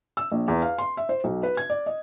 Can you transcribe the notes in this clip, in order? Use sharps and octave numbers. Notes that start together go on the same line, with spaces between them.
E6
A#1
E2
F5
C6
E5
C5
B1
B4
G#6
D5
D#5